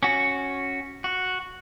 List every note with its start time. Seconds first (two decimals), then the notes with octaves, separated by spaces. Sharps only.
0.03 C#4 F#4
1.04 F#4